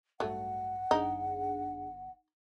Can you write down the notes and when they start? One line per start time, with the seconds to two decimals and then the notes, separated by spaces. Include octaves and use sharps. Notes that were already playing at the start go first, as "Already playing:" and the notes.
0.20 A1 G2 F#3 A3 F#5
0.91 G1 F#2 D4 D#4 G#4